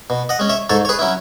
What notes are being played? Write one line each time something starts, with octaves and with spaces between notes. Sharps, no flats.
B2
D#5 F#5
G#3 C#4
C#5 E5
G#2 A4 C#5
C#5
G#4 B4
F#3 C#4 E4